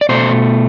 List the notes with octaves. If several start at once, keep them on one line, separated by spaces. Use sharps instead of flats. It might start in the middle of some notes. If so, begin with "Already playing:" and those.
D5
B2 A3 C5